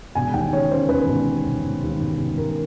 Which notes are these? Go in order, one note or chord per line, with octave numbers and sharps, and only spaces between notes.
E1 G#5
D#2 G5
C#3 C#5
C#3 C5
D#2 B4
E1
E1
E1
E1
D#2
E1
E1
E1 A#4